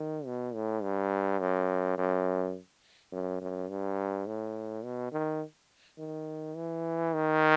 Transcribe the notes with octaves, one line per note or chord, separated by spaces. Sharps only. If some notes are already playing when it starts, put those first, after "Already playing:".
Already playing: D#3
B2
A2
G2
F#2
F#2
F#2
F#2
G2
A2
B2
D#3
D#3
E3
D#3